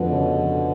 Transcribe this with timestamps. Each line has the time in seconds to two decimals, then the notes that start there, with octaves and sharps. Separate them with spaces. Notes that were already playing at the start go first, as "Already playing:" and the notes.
Already playing: F2 B2 D3 G#3
0.12 C#3
0.38 F2